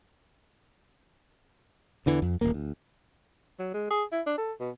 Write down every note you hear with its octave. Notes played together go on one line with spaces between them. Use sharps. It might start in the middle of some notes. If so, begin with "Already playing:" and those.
E2 D3 E3
F2
D#1 A1 D#2 A#3
D2
F#3
G#3
G#4
E4
D4
A4
B2